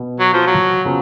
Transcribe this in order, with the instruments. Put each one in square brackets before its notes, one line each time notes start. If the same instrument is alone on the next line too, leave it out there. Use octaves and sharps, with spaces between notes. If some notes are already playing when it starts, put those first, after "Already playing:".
Already playing: [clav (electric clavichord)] B2 B3
[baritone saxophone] F#3
F3
F#3
[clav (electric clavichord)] C#3 F3 B3